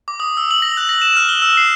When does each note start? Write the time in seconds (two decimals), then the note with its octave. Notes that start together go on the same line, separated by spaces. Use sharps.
0.08 D6
0.20 D#6
0.37 E6
0.51 F#7
0.62 A#6
0.77 F#6
0.89 A#6
1.02 E7
1.17 F6
1.29 G7
1.42 E6
1.57 C7